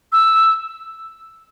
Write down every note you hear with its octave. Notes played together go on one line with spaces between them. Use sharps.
E6